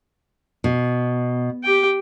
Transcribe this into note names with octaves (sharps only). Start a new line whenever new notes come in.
B2
G4 G5